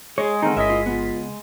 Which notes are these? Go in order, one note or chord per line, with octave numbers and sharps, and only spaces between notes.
G#3 G#4 C#5
D3 D#3 C4 D#4 A#5
G1 C#4 E4 A#4 D#5 E5 B6
F4
C#2 B3 F4